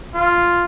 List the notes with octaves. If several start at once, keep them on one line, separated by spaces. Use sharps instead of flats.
F4